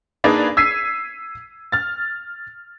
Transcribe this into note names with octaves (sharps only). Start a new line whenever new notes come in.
A#3 D4 D#4 G#4 B4 D5
E6 G#6 B6 C7 D#7
F6 A6